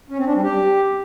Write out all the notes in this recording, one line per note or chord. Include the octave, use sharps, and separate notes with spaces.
C#4
C4
D4
G3
G4